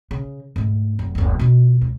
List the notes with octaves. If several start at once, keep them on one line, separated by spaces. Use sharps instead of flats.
C#3
G#2 A3
F1 F#2
F#1 D2
B2 F4
C#2